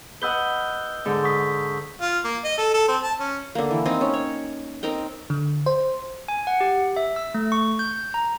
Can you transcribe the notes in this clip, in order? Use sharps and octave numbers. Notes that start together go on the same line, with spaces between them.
B4 D#5 F#5 E6 G6 G7
G#2 D3
C#6 D#6 B6
F4
A#3
D#5
A4
A4
C4
A5
C#4
D3 A#3
E3
C4 D#4
C#4
C#5
C4 D#4 A#4 G5
D3
C5
G#5
F#5
G4
E5
E6
A3
C#6
G6
A#5